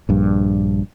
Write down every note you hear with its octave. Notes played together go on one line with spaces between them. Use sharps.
A#1 G2